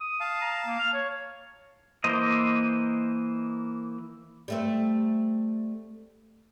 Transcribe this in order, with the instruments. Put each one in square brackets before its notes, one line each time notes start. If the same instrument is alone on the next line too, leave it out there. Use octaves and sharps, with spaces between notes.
[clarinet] D#6
[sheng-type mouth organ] F5 A5
[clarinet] A#5
A#3
F6
C#5
[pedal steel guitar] E3 A#3 C5 D#5
[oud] G3 A3 C4